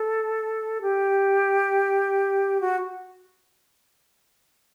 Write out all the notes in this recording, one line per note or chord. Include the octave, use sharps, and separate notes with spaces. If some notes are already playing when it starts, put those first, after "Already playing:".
Already playing: A4
G4
F#4